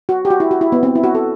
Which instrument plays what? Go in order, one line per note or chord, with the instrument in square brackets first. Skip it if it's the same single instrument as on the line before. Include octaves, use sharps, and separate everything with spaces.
[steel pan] F#4
G4
F#4
E4
F#4
E4
B3
C4
E4
F#4
A4